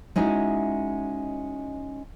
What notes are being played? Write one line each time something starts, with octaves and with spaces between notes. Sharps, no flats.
G#3 C#4 D#4 E4 F#4